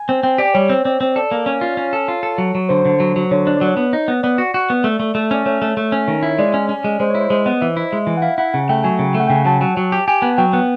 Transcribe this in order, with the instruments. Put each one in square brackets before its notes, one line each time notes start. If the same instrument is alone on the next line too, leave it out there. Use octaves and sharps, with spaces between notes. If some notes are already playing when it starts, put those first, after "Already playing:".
Already playing: [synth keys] G#5
[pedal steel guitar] C4
[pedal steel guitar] C4 [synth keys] G5
[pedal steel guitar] G4 [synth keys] D5
[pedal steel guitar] G3 [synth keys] C#5
[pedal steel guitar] C4
[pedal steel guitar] C4 [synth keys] D5
[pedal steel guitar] C4
[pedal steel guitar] A4 [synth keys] D5
[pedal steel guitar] A#3
[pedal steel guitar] C#4 [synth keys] C#5
[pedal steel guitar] F4
C#4
A4
F4
A4
F#3
F#3
[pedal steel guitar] D3 [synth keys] C5
[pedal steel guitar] D3
F#3
F#3
[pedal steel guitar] D3 [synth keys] C#5
[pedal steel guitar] D4 [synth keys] C#5
[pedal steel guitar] F#3 [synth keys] D5
[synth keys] C#5
[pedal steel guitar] B3
D#4
B3
[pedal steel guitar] B3 [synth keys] D5
[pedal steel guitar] F#4
F#4
B3
A3
A3
A3
[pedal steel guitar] C#4 [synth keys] D5
[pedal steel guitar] A3 [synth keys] C#5
[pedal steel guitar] A3
A3
C#4
[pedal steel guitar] D#3 [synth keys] C#5
[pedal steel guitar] E4
[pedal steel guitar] G#3 [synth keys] D5
[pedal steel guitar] C#4
C#4
G#3
[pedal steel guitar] G#3 [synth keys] C5
[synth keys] C#5
[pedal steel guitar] E4
[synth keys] C5
[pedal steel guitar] G#3 [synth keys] C5
[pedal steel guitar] B3 [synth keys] D#5
[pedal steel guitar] E3 [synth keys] E5
[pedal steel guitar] E4
G#3
E3
[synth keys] F#5
[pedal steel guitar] E4 [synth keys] F5
[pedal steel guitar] E4 [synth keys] F#5
[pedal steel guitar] C#3 [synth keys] F#5
[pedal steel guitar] A3 [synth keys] G5
[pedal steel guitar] F#3 [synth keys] G#5
[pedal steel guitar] C#3
A3
[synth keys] F#5
[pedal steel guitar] C#3 [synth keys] G5
[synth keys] G#5
[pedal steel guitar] F#3 [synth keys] A5
[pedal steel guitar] F#3
F#3
G4
[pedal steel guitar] G4 [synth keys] G#5
[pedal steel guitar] B3 [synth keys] G#5
[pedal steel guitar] F#3 [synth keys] G5
[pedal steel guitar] B3 [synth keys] F#5